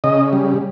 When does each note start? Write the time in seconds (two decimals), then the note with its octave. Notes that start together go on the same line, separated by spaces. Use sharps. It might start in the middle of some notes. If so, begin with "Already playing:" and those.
0.04 C#3 D#5
0.33 G3